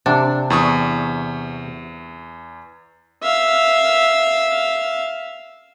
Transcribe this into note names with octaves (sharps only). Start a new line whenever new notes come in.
C3 D4 F#5 A5
E2 C#6 D#6
E5 F5